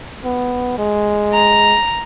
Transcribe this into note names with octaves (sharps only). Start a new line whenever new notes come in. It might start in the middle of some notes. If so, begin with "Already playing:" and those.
B3
G#3
A#5